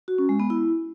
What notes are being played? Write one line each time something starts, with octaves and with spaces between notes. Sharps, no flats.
F#4
C#4
G#3
B3
E4